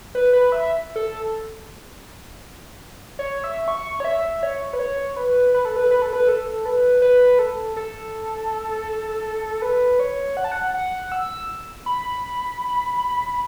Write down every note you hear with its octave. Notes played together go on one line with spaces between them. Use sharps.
B4
B4
E5
A4
C#5
E5
C#6
C#5
E5
C#5
B4
C#5
B4
B4
A4
B4
B4
A4
B4
A4
B4
B4
A4
A4
B4
C#5
F#5
A5
F#5
F#5
E6
B5